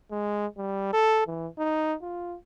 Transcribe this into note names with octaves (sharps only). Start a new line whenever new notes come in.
G#3
G3
A4
E3
D#4
F4